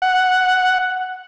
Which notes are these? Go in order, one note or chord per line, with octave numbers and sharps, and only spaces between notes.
F#5